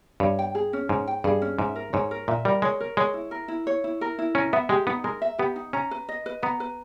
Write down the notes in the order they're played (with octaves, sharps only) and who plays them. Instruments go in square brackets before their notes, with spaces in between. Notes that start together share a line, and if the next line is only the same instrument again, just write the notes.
[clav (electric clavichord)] G2 [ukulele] C#5
[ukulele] G5
G#4
C#4
[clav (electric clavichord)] G#2 [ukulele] C#5
[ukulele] G5
[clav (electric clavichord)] G2 [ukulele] G#4
[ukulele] C#4
[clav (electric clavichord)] G#2 [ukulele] E5
[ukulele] A#4
[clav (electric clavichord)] G#2 [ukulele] C#5
[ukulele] A#4
[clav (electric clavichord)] A#2 [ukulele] E5
[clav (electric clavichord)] G3 [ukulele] A#4
[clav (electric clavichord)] G#3 [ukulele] C#5
[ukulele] A#4
[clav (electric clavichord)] G#3 [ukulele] C#5
[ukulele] E4
A#4
E4
C#5
E4
A#4
E4
[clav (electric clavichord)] C#4 [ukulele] A#4
[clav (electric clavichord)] B3 [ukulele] E5
[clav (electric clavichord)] G#3 [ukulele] G4
[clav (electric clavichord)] B3 [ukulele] D#4
[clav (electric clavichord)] G#3 [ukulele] A#4
[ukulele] E5
[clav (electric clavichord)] B3 [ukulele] G4
[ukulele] D#4
[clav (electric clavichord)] C#4 [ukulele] A#5
[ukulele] B4
D#5
B4
[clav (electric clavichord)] B3 [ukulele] A#5
[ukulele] B4